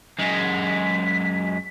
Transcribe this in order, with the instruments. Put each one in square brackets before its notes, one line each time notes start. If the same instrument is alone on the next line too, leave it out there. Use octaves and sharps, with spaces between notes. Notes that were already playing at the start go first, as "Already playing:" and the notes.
[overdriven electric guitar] F#2 G#3 [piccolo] B6